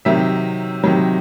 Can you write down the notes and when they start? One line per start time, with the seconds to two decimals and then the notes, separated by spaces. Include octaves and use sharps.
0.05 C3 D#3 F#3 E5
0.84 C3 D#3 F#3